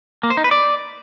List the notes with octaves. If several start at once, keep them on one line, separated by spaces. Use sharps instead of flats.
A#3
C5
D#4
B4
D5